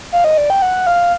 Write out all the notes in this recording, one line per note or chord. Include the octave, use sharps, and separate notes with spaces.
F5
D#5
D5
G5
F#5
F5